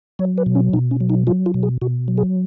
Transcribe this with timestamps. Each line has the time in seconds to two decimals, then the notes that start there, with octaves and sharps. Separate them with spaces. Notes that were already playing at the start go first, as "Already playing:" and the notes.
0.19 F#3 C#5
0.38 B4
0.46 B2
0.55 C#4
0.73 B2 D#4
0.91 C#4
1.01 F#3
1.10 D#4
1.27 F#3 F4
1.46 F4
1.54 B2
1.63 G#4
1.82 B2 F#4
2.08 F#3
2.18 G#4